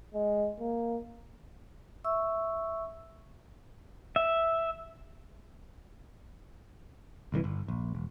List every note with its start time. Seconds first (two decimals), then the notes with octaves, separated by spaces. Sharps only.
0.14 G#3
0.60 A#3
2.04 E5 C#6 E6
4.16 E5
7.32 G1 C2 C#3 E3
7.44 G1
7.68 A#1
7.95 E1